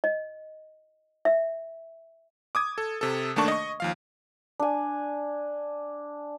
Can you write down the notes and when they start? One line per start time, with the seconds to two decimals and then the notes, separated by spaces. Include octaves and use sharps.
0.04 D#5
1.25 E5
2.55 D6 D#6 G#6
2.78 A4
3.01 C3 A4
3.36 D#2 A3 A#3 D4 A5 C#6
3.48 D#5 C#6
3.80 D#2 F3 F5
4.60 D4 G#5